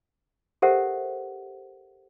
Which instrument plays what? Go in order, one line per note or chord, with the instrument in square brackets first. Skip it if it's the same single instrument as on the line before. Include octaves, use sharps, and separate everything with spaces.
[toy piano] G4 A4 A#4 C5 E5 F#5